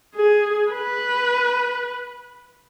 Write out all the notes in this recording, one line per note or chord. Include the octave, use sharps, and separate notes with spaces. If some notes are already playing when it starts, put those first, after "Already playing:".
G#4
B4